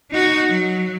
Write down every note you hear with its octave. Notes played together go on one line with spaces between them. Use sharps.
D#4 F#4
F#3